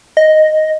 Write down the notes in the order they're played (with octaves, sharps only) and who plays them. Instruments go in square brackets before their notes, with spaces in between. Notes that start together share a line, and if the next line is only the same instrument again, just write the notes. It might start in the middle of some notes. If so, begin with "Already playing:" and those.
[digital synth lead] D#5